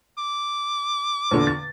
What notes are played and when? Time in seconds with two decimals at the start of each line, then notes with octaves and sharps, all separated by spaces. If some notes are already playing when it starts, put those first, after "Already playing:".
0.18 D6
1.31 E2 A#2 D3
1.47 A6